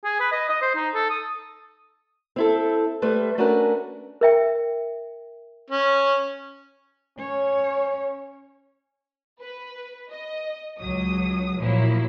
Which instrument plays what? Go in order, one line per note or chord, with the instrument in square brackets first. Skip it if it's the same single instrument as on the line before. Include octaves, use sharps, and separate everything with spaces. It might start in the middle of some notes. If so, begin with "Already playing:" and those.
[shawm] G#4
B4
D#5
D#5
C5
D#4
A4
D#6
[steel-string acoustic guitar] C4 E4 A4
G3 A3 B4 C5
A3 C#4 D4 F#4 A#4 B4
[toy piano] A#4 E5 G5
[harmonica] C#4
[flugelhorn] C#4 [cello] C#5
[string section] B4
D#5
C#2 F#3 D#6
A#2 F3 F#3 A#3 E4